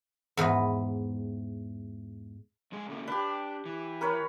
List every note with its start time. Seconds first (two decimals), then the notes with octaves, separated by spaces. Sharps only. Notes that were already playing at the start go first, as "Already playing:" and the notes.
0.37 E2 G#2 B4 D#5
2.72 F2 G#3 G#4
2.88 C#3 A3 A#3
3.07 D4 G4 B4
3.66 E3
4.01 A#4 B4 C#5